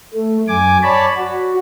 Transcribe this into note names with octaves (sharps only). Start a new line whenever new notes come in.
A3
F#2 G#5 D6
C#5 D5 A5 B5
F#4